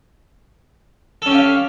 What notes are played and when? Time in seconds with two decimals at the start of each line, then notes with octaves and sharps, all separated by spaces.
1.22 A4
1.26 C#4
1.30 G4
1.35 F5